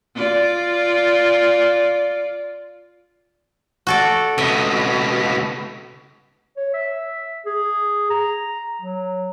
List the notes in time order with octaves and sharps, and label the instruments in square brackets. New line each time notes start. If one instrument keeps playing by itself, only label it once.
[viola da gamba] F4 D5
[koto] F#4 A4 D5
[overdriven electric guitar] C#2 B2 [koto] D#5 E5
[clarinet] C#5
E5
G#4
A#5
F#3